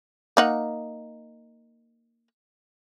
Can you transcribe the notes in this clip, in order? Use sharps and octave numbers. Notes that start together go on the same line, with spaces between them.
A#3 D#4 F#5